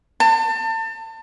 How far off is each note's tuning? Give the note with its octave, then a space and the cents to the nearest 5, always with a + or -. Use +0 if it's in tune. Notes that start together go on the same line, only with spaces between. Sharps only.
A5 +35